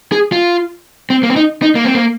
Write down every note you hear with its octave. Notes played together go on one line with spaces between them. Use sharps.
G#4
F4
C4
A#3
C4
D#4
D#4
A#3
C4
A#3